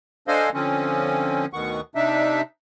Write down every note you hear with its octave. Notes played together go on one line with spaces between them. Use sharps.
D4 A4 C5 D#5 F5 G#5
D3 F3 C4 C#4
D2 B2 D#3 F#5 C#6
C3 D4 D#4 E5